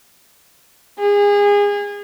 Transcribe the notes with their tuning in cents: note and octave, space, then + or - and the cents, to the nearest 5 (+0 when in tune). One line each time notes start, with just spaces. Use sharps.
G#4 -30